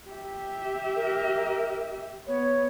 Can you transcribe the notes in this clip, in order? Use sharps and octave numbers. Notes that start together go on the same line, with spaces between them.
G4 E5
A#4
B3 C#5